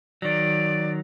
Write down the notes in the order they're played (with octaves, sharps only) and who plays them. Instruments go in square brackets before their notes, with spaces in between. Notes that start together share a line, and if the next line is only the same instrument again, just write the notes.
[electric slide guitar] D#3 F#3 [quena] D5